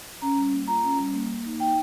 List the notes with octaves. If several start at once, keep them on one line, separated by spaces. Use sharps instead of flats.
C#4 A#5
G3
A#3
F4 A#5
C#4
G3
A#3
A#3
D#4
D#4 G5